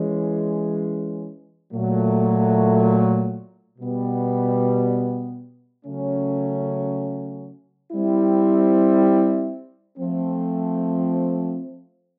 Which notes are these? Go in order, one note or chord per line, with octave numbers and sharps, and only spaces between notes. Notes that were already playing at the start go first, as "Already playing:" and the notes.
Already playing: E3 G#3 C#4
A#2 F#3 A3
B2 G3 B3
C#3 F#3 A3 C#4
G3 C4 E4
F3 A3 C4